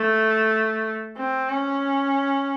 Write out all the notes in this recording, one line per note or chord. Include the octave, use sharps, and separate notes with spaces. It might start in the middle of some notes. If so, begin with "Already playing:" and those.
Already playing: A3
C4
C#4